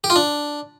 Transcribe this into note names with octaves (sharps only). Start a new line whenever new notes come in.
G4
F4
D4